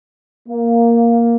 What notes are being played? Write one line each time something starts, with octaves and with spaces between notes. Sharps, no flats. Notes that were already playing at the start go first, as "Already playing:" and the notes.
A#3